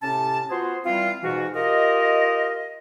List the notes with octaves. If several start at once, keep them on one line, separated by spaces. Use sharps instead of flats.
A2 C3 C#4 A5
B3 F4 F#4 G#4 C5
E3 G3 C4 F4
G#2 B2 E3 F4 F#4
F4 G4 A#4 D#5